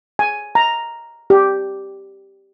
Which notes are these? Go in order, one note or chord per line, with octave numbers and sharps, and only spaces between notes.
G#5
A#5
G4